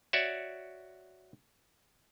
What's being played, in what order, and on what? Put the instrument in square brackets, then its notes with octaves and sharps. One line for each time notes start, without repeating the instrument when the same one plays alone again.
[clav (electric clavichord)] F#4 C#5 D5 E5